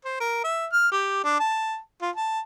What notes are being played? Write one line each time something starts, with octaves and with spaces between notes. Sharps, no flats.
C5
A#4
E5
F6
G4
D4
A5
F4
A5